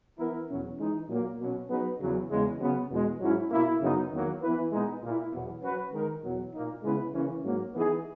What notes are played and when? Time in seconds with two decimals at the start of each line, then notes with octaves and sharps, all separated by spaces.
0.18 E3 B3 E4 A#4
0.48 E2 B2 F#3 C#4
0.79 E3 G#3 D#4
1.09 A#2 F#3 A#3
1.39 B2 F#3 C#4
1.69 F#3 B3 D#4 G#4 B4
2.00 E2 C#3 F#3
2.30 E2 C#3 G#3
2.60 C#3 F#3 B3
2.91 E2 B2 G#3
3.20 G#2 F#3 C#4 E4
3.50 B2 A#3 E4
3.81 F#2 C#3 F#3 B3 D#4
4.12 E2 D#3 F#3 A#3
4.41 E3 B3 E4 B4
4.71 A#2 G#3 B3 D#4
5.02 A#2 A#3 E4
5.32 E2 B2 F#3 B3
5.62 F#3 C#4 F#4 B4
5.92 D#3 G#3 D#4 A#4
6.23 E2 B2 F#3
6.53 A#2 A#3 D#4
6.83 C#3 G#3 B3 E4 B4
7.13 C#3 E3 A#3 C#4
7.44 G#2 F#3 A#3
7.74 E3 B3 D#4 G#4